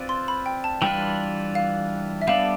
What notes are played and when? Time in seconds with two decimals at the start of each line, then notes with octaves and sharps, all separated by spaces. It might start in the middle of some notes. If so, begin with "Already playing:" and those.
Already playing: C4 F4 B4 D5
0.09 C6
0.28 B5
0.46 G5
0.64 A5
0.82 E3 G3 D4 F4 B4 G5
1.55 F5
2.22 E5
2.27 G3 B3 D4 A4 D5 F5